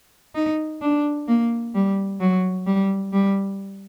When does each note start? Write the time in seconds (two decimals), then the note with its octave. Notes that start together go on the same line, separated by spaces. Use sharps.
0.35 D#4
0.81 D4
1.28 A#3
1.75 G3
2.20 F#3
2.66 G3
3.13 G3